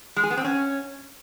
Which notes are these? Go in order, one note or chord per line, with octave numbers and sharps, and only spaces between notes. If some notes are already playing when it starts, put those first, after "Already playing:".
G#3
G#4
B3
C4
C#4